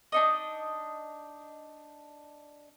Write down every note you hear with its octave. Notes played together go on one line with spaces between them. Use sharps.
D4 D#4 D#5